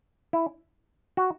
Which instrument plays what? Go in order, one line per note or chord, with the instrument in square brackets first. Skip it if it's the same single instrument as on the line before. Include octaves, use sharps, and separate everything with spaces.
[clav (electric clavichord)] E4
F#4